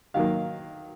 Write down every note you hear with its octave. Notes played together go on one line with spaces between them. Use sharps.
D#3 F#3 A#3 F5